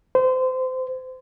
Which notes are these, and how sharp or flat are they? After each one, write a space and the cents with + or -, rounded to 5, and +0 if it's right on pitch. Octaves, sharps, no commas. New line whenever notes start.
C5 -25